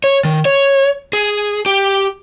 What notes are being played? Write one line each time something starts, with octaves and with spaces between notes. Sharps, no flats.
C#5
D#3
C#5
G#4
G4